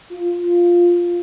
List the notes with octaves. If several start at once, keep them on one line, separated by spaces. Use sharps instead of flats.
F4